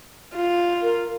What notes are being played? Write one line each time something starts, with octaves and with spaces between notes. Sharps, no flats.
F4
A#4